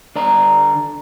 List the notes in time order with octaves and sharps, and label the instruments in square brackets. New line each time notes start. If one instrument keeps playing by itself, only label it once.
[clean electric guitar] D3 D5 A#5